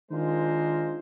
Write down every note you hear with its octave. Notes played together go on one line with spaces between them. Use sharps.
D#3 G#3 D4 F4 A#4 C5